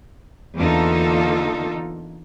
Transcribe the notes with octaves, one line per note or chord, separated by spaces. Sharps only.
E2 D3 A#3 D#4 F4 A4